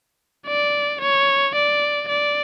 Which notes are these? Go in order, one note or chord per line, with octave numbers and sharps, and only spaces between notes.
D5
C#5
D5
D5